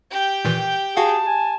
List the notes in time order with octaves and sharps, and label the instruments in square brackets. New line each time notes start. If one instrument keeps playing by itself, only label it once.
[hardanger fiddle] G4 G5
[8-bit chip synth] A#2 D#3 E3
[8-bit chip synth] F#4 F5 F#5 [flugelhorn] G#4 [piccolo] A5
[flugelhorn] G#5